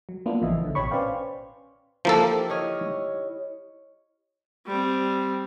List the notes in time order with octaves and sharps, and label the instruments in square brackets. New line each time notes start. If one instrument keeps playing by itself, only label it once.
[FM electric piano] F#3
A#3 B3 D4 E4 F4
A1 C#3 E3 F3 D#5 E5
A1 D3
A1 B2 G4 C#5 B5 C#6
C#4 B4 C5 D5 F5 G5
[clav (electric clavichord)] F3 A#3 A4 [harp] E4 G4
[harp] C#5 D#5 F6
[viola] G3 C4